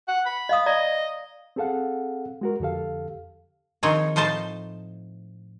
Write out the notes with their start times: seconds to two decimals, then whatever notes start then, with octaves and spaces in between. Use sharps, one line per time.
0.08 F#5
0.26 B5
0.49 D#5 F5 D#6
0.66 D5 D#5 A#5
1.56 C4 G#4 A4 F5 F#5
2.41 G#3 F#4 A#4
2.60 F2 D3 G4 A4 F5
3.83 D#3 F3 C4 D#4 G#4 C#5
4.16 A2 F3 D#4 C5 A5